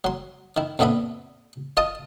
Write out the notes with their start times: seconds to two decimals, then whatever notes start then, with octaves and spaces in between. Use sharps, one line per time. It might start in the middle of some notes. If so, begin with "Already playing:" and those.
0.04 F#3 C6
0.57 D#3 E4
0.79 F2 A#2 B3 D4 E5 B5
1.77 F4 D#5 A5 D#6